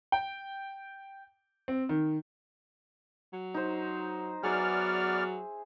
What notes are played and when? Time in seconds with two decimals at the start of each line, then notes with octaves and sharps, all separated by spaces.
0.12 G5
1.68 C4
1.89 D#3
3.33 F#3
3.54 D#4 C5
4.43 F#3 B3 G#4 D5 E5 F6